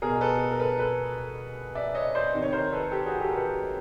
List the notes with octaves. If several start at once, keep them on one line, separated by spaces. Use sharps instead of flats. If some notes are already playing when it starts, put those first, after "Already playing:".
B2 G#4 A#4
A4 B4
A#4
A4 B4
A4 B4
D5 E5
C#5 D#5
C5 D5
C3 D#3
C#5
A#4 C5
A4 B4
G4 A4
F#4 G#4
G4 A4
A#4
A4 B4